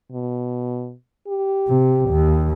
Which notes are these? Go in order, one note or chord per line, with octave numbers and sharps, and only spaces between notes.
B2
G4
C3
D#2